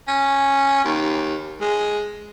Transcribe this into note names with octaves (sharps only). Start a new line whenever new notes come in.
C#4
D#2
G#3